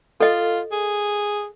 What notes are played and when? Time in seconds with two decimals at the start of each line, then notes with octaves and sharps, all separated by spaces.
0.20 F4 A4 D#5
0.72 G#4